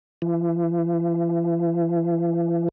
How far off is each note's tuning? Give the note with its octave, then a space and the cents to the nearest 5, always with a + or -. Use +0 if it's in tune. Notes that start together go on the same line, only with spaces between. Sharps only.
E3 +45